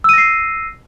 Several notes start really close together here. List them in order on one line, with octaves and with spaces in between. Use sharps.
E6 D#7 A#6 C7